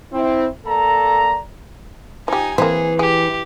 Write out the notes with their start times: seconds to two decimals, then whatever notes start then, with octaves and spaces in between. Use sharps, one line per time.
0.12 C4 E4
0.67 A#3 A4 D5 A#5
2.28 F3 D#4 G4 G#5
2.58 E3 A#3 C4 G#4
2.99 G4 G#4